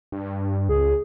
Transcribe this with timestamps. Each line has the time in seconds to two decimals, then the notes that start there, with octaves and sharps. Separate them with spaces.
0.12 G2
0.69 C#2 G#4